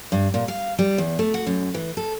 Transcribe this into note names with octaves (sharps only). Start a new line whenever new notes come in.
G2
A#2
F5
G3
E2
A3
F#4
F#2
E3
A4